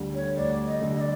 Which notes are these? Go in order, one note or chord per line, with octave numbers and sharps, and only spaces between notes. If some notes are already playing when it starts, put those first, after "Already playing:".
Already playing: D2 D3 G3
C#5
D2 D5
D#5
D3 G3
D#5
D5